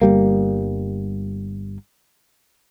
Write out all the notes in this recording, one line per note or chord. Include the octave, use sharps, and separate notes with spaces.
G1 G3 A#3